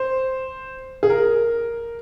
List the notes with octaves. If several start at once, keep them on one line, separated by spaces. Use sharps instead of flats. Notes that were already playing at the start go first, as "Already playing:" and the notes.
Already playing: C5
G#4
A#4